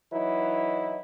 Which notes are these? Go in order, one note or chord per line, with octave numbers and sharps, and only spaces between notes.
E3 F#3 D#4 E4